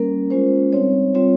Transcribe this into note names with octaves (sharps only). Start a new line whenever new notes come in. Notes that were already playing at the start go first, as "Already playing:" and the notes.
Already playing: G3 A#3 C#4 A#4
G#3 C#4 F4 C5
G3 C4 D#4 C#5
G3 C4 F4 C#5